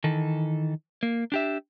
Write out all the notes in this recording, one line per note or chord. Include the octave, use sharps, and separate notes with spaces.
D#3 E3 A4
A#3
D4 G4 E5